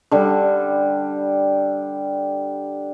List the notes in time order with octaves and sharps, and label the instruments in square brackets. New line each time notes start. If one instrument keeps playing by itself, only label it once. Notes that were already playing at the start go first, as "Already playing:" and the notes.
[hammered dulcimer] D3 G3